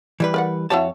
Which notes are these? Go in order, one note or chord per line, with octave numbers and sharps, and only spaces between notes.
E3 G3 B4
A#4 D5 F#5
F2 E4 F#4 G4 C#5 A5